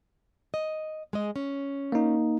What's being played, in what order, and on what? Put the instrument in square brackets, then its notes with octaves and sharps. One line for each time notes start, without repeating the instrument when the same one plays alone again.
[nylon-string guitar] D#5
G#3 G#4 D#5
C#4
[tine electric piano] A#3 D#4